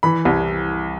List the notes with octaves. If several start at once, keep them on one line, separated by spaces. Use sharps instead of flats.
E3 B5
C2